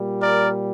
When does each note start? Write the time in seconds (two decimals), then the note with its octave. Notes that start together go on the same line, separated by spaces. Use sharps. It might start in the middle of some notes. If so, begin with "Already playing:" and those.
Already playing: A#2 G3
0.22 A#4 D5